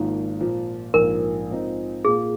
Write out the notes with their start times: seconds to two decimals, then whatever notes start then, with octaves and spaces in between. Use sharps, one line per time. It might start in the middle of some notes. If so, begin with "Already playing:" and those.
Already playing: G#1 G#2 F3 A#3
0.39 A#2 F3 A#3
0.94 A#1 G#2 F3 A#4
1.49 G#2 F3 C4 D#4
2.05 A#2 A#3 F4 G#4